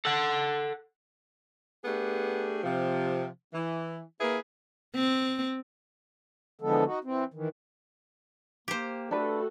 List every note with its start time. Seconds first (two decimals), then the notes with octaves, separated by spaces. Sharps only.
0.05 A4 F#5
1.85 A3 B3 D4 G4 G#4
2.64 C3 F3
3.53 E3
4.20 A#3 E4 G#4 B4
4.95 C4
6.61 D3 E3 F3 G#3 B3 A4
6.86 D#4 F#4
7.04 E3 C4
7.34 D#3 E3
8.68 A#3 G4 C5
9.11 A3 D4 F#4 A4 B4